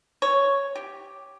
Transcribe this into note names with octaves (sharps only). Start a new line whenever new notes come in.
C#5
G4